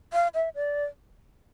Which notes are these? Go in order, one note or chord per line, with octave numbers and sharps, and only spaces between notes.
F5
E5
D5